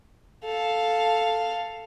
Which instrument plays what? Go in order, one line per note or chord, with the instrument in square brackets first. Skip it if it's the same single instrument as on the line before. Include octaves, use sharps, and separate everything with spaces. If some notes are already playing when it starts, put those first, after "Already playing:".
[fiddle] A4 F5